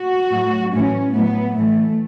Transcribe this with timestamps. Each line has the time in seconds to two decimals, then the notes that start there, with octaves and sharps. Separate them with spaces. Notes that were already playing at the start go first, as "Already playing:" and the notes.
Already playing: F#4
0.31 A2 F#3
0.72 A2 E3 C#4
1.14 A2 F#3 B3
1.56 A2 E3 A3